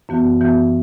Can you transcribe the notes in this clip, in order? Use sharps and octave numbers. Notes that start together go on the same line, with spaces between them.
F#2 E3 B3 F#4
F#2 E3 B3 F#4